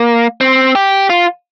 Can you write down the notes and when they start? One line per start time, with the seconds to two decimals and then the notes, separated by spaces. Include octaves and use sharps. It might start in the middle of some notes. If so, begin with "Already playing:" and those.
Already playing: A#3
0.41 C4
0.75 G4
1.10 F4